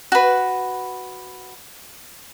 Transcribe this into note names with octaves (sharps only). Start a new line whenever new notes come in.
F#4 B4